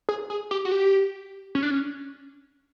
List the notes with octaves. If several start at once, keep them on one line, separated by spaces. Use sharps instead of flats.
G#4
G#4
G4
F#4
G4
C#4
D4
C#4